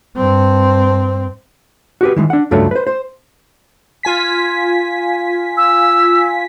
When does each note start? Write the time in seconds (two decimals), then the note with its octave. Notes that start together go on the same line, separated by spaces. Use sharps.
0.17 G2 C4
2.01 F#4 G4 B4
2.16 D#3 E3 G#3
2.30 D4 F#5
2.51 C#2 G2 F#3 A3 D4 C#5
2.71 B4 C5
2.87 C5
4.03 F4 G#5 B6
5.57 E6